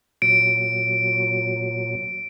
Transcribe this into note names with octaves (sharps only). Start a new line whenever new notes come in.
A#2 F#3 D7